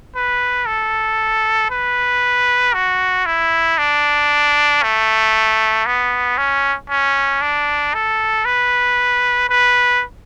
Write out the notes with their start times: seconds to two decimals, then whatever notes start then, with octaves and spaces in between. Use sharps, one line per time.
0.15 B4
0.66 A4
1.70 B4
2.74 F#4
3.26 E4
3.78 D4
4.83 A3
5.86 B3
6.38 C#4
6.90 C#4
7.41 D4
7.94 A4
8.45 B4
9.49 B4